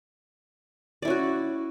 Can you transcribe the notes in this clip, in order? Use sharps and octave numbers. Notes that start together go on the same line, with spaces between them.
C#4 E4 F#4 D5